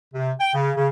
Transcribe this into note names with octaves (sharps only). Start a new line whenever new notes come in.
C3
G5
C#3
C#3